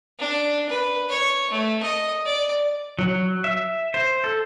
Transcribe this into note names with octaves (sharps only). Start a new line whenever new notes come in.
D4
B4
C#5
A3
D#5
D5
F#3
E5
C5
A4